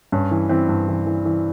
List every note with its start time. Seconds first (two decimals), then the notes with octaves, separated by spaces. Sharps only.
0.12 G2 C#4
0.31 E3
0.49 E3 C4
0.69 G2
0.88 E3
1.06 E3
1.25 E3